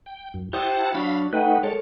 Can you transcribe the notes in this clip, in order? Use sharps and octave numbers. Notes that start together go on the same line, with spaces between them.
G5
F#2
E4 G4 C5 F#5 A5 D#6
F#3 D4 F#4 F5 B5
A3 D#4 B4 F#5 G5 F#6
G#3 A4 A#4 C#5 A5